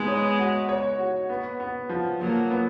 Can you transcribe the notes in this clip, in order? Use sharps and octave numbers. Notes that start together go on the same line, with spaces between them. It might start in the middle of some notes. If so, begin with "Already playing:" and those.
Already playing: G#3 B3 D#4
C#5
F#4
C#5
F#4
B3
B3
F3
F3 F#3 A#3
B3